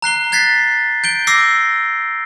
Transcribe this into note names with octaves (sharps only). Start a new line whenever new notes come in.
A#5 F#6 C7 G7
F#6 G#6 A6 B6 C7
G6 D7 G7
D6 E6 A#6 C7